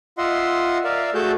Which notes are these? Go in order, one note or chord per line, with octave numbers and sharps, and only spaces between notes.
F4 D#5 E5 F#5 C6
A#4 D5 E5 F5
A3 F#4 G#4 A4 A5 G6